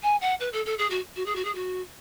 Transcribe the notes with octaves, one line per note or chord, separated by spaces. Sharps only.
G#5
F#5
B4
A4
A4
G#4
F#4
F#4
G#4
F#4
G#4
F#4